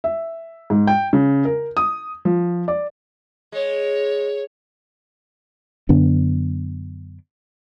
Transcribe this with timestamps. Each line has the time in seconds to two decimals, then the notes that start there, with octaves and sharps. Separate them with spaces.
0.04 E5
0.70 G#2
0.87 G5
1.13 C#3
1.45 A#4
1.77 D#6
2.25 F3
2.68 D5
3.52 G#3 C#5
5.89 F#2 D3 B3 D4